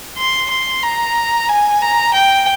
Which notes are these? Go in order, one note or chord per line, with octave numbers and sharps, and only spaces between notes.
C6
C6
A#5
G#5
A#5
G5